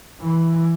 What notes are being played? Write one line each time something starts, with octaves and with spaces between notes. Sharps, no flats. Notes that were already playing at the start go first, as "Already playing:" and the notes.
E3